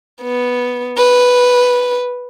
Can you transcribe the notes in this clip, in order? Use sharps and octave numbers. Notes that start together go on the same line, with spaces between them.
B3
B4